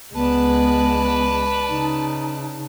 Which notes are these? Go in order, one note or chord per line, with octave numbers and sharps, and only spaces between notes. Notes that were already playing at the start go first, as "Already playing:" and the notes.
C#2 G#3 B3 B4 D5 A5
C#3 D#4